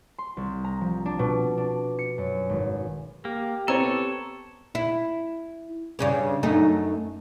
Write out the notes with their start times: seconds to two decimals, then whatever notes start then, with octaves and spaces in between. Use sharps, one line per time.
0.18 C6
0.37 C2
0.64 A#5
0.81 F3
1.06 D4
1.19 B2
1.58 D4
1.99 C#7
2.18 F#2
2.49 G#1
3.25 A#3 G4
3.68 B3 C4 A4 C#5 A#5
4.75 E4
5.99 G2 C#3 C#4
6.43 F#2 A3 D#4